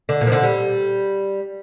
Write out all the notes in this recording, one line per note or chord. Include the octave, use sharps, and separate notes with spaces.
D3
A#2
F3
D3
G3